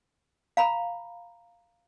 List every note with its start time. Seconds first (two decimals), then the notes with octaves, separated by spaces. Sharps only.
0.57 F5 A#5 B5